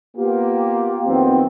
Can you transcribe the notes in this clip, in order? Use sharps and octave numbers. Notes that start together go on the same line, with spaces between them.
A#3 B3 F4 G4
F2 D#3 F#3 B3 C4